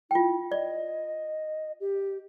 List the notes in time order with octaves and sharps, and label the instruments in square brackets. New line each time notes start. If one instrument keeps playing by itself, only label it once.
[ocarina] E4 [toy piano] F4 G5
[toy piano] D5 [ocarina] D#5
[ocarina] G4